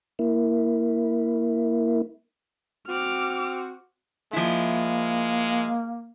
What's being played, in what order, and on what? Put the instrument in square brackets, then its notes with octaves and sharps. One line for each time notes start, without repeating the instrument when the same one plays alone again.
[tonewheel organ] A#3 E4
[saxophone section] C4 F#4 [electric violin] D6 F6
[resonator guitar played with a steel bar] F3 E4 [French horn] G#3 [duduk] A#3